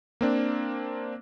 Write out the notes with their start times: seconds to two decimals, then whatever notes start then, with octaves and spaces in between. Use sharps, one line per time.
0.21 A#3 C4 D4